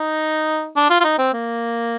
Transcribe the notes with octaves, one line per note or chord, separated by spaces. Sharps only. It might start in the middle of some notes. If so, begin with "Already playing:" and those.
Already playing: D#4
D4
F4
F4
D#4
C4
A#3